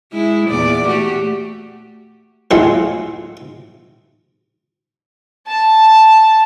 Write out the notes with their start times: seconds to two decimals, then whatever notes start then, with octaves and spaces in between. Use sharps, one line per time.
0.13 G#3 E4
0.49 E2 A#2 D5
0.85 A3 F#4 G4
2.51 A2 F#3 G#3 E4 F4 A4
5.48 A5